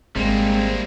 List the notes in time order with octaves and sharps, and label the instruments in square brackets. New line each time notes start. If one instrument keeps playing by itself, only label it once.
[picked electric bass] G#1 [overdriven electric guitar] G3 A#3 [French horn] G#3 [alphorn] C4